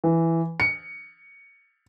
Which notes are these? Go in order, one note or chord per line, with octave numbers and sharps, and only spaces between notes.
E3
C#7